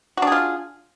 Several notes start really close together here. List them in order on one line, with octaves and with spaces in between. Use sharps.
F#4 D4 G#4 F4